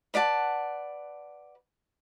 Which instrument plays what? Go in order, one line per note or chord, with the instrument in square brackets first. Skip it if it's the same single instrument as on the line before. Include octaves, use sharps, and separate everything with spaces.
[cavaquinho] B4 D5 F#5 A5